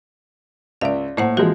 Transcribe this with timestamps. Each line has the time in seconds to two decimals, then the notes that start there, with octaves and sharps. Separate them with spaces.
0.81 C#2 D5 E5 F5
1.17 A2 A#3 C5 F#5
1.37 C3 E3 F3 G#3 F#4